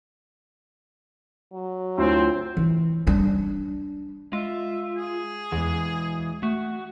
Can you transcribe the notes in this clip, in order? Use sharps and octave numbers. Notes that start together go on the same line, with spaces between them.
F#3
D2 C4 E4 F4 C#5
E3
G3 D4
G#3 F4 E5
G#4
E2 E3 G#3
A3 F#4